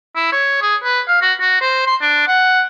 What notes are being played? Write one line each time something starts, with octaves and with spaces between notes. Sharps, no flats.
E4
C#5
G#4
B4
F5
F#4
F#4
C5
C6
D4
F#5